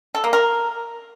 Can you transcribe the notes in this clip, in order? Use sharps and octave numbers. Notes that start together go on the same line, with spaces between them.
A4
A#3
A#4